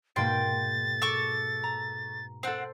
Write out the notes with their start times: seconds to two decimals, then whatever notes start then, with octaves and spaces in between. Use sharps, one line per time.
0.16 G#2 B2 A#3 G5 C6 A6
1.02 A4 C#6 D6
1.64 A#5
2.43 C4 A4 C5 F#5